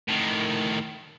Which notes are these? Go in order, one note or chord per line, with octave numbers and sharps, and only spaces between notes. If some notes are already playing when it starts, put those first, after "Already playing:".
A2 D#3